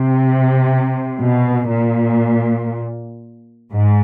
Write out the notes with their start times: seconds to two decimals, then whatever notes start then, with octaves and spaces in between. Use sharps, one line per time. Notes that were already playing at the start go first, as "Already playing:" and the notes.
Already playing: C3
1.19 B2
1.70 A#2
3.72 G#2